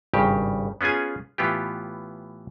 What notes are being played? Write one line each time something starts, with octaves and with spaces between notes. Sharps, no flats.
G#1 G2 C#3 G4
B3 C#4 F4 G#4 G#5
A2 E3 B3 F4 G4